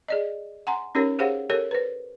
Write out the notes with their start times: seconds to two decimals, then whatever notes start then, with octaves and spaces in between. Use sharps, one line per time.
0.08 G#4 D5 D#5
0.67 F#5 G#5 A#5 C6
0.95 C#4 D#4 G4 A#4 C#5
1.19 G4 G#4 C5 C#5 F5 F#5
1.50 G4 A4 A#4 C#5
1.71 B4 C5